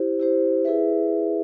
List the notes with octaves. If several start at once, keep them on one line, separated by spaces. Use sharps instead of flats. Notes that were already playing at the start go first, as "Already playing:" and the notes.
Already playing: E4 G4 C5
E4 G4 C5
E4 G#4 B4 E5